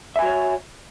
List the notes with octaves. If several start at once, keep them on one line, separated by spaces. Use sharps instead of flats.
F#4 C#5 E5 G#5